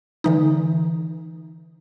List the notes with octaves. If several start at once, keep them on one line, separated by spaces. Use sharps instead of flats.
D3 E3 D#4